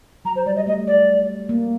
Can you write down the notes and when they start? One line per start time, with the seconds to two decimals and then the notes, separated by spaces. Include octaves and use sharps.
0.25 F#3 A#5
0.36 C5
0.46 G3 D5
0.56 D#5
0.66 A3 D#5
0.87 D5
1.49 A#3